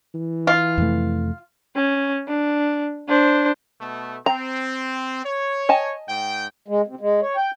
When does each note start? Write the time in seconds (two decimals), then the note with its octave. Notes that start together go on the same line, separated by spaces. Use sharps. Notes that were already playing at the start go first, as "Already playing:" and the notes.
0.14 E3
0.47 F4
0.78 F2 C3 A3
1.76 C#4
2.28 D4
3.08 D4 C5
3.81 B2 A3
4.26 C4 A#5
5.25 C#5
5.69 D#5 G#5 A5
6.08 G#2 G5
6.68 G#3
6.87 C3
7.01 G#3
7.22 C#5
7.36 G5